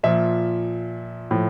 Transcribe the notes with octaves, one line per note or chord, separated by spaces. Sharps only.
A#2 F3 E5
A2 F3